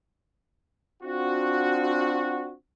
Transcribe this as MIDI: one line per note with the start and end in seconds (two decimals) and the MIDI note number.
1.03 2.53 60
1.03 2.53 62
1.03 2.53 65
1.03 2.53 66